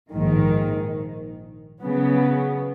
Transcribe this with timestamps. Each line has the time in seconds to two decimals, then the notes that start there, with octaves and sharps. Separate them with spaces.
0.11 A#1 G#2 D#3
1.84 C#3 F#3 B3